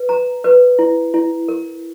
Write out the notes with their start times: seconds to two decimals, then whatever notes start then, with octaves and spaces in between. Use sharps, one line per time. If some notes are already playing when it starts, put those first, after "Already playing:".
Already playing: B4
0.09 A#5
0.44 B4
0.79 E4
1.14 E4
1.48 A#4